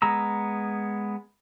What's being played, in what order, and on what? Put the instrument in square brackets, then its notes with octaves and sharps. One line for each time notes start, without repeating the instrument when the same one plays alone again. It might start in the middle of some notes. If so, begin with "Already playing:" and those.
[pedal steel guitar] G#3 B3 A#5 E6